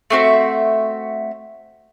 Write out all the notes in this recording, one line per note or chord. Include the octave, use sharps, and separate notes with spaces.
A3 C4 F#4 E5